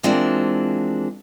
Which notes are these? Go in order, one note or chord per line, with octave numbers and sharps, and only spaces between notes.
E3 F3 G#3 A#3 C4 D4